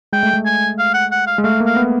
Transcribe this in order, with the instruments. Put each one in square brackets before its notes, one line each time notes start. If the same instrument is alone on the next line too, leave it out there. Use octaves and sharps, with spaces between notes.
[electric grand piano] G#3 [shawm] G5
[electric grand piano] A3
G#3
[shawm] G#5
F5
F#5
F#5
F5
[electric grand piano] G#3
[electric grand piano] A3 [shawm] F5
[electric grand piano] A#3
[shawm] F5
[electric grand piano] B3